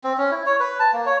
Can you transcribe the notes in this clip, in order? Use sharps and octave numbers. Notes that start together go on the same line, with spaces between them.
C4
C#4
E4
C#5
B4
A5
A#3
C#5